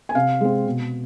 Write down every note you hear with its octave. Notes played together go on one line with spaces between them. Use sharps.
G#5
C3 F5
G#3 C4
B2